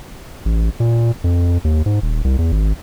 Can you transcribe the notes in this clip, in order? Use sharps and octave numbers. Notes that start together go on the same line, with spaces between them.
A1
A#2
F2
D#2
G#2
D#1
C2
E2
G#1